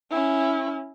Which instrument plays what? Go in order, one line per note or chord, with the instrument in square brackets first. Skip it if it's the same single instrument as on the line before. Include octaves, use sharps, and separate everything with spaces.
[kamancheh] C#4 E4